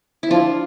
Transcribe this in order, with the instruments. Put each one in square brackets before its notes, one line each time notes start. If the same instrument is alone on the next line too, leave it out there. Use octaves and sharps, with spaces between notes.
[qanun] E4
[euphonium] F3 [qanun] D4 F4